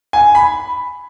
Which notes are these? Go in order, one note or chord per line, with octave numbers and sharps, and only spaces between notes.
G#5
B5